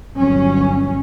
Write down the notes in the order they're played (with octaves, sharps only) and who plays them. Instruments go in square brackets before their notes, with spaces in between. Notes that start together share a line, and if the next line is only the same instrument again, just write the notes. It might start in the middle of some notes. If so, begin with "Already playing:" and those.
[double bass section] G1 F#3 C#4